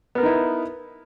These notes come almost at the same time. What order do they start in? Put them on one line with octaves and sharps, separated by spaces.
B3 A#4 B4 D#4 E4